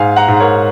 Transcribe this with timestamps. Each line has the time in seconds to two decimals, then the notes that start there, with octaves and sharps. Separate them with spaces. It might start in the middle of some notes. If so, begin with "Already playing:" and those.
Already playing: G#2 F5 G#5
0.16 F#5 A#5
0.28 G#2
0.40 A#4 C#5